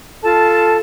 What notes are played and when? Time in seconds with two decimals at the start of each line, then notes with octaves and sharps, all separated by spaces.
0.23 F4 A4 A5